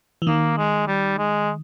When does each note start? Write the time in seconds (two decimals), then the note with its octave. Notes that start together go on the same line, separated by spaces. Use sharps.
0.22 E3
0.27 D#3 A#3
0.58 G#3
0.88 G3
1.18 G#3